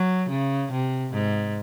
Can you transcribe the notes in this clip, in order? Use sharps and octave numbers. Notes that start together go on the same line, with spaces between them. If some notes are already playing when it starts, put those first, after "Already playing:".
Already playing: F#3
C#3
C3
G#2